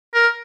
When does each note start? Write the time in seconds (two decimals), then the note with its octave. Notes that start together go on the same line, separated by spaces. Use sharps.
0.14 A#4